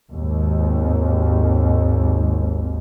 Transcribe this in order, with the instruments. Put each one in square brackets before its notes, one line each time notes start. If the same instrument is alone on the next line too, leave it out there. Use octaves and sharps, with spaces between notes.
[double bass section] G#1 D#2